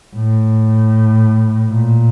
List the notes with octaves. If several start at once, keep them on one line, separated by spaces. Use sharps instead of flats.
A2
A#2